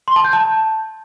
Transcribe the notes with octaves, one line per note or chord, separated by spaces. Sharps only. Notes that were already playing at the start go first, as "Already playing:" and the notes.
C6
A5
G6
A5